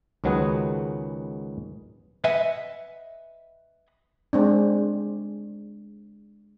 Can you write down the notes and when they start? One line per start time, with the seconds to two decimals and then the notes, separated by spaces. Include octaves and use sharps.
0.24 C#2 D#3 F#3 B3 G#4 F#5
2.24 B4 D#5 E5 F#5 G#5
4.33 G#3 C4 D4